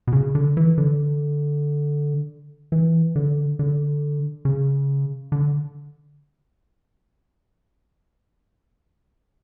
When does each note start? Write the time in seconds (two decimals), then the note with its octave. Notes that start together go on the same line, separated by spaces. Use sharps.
0.07 B2
0.13 C#3
0.35 D3
0.57 E3
0.78 D3
2.72 E3
3.16 D3
3.59 D3
4.45 C#3
5.32 D3